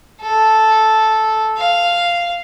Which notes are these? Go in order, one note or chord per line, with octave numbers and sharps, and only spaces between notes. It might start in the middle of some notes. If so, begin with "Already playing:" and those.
A4
F5